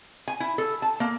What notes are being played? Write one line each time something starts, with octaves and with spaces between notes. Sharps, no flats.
G#5
E4
A4
A5
A#3